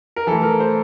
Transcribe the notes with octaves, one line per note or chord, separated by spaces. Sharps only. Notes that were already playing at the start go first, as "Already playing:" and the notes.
A#4
E3 A3 E4 A4
A#4
C5